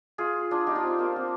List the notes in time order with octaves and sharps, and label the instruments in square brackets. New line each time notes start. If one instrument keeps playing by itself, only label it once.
[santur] F4 G#4
D4 F4
D#4 G4
D4 F4
C4
A#3
C4